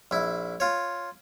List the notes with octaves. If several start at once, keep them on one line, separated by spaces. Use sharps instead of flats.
A#1 E4
F4 C#5